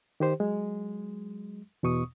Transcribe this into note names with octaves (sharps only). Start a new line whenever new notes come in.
D#3 G4 C5
F#3 G#3
E2 B2 C#6 D#6